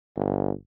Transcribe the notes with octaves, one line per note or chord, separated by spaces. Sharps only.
G1